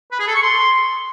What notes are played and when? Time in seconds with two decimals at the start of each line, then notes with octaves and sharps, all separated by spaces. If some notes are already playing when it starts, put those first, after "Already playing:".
0.12 B4
0.19 G#4
0.27 A4
0.35 C#6
0.43 C6